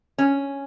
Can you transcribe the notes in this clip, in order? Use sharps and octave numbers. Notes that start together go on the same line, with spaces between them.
C#4